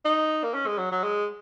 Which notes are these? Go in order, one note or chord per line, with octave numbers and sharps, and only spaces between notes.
D#4
A#3
C#4
G#3
F#3
F#3
G#3